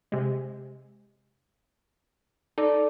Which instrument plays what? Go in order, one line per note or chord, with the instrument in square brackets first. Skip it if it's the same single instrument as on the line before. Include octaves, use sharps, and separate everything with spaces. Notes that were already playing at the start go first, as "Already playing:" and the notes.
[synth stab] C3 G#3
[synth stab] D#4 [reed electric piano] A4 D5